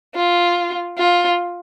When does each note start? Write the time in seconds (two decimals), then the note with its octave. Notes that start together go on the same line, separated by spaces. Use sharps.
0.15 F4
0.98 F4